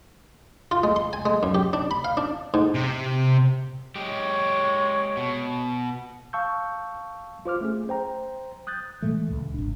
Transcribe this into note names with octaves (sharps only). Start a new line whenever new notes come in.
F4
G#3
C6
G#5
G#3
F#2
G4
D4
B5
F5
D4
G#2
C3
G#3 G4 C#5
B2
F5 A5 C#6 E6 G6
F4 C5 D6 F6
A3 C#4 G#4
C5 G5 A#5
D#6 F#6 G6 A6
A#2 E3 G#3 A3
C#2
G#1 D4